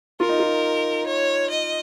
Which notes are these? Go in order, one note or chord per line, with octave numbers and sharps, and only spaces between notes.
F4 A#4
D#4
F4
C#5
D#5